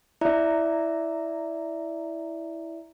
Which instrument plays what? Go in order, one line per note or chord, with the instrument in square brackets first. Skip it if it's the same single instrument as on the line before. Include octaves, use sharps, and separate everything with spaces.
[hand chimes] E4 D5 E5 A#5